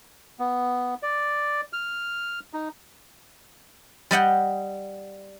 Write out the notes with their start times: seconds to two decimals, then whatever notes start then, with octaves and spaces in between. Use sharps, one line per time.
0.39 B3
1.02 D5
1.73 F6
2.53 D#4
4.11 G3 D#5 F#5 G5